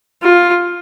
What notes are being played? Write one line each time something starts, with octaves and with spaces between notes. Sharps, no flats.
F4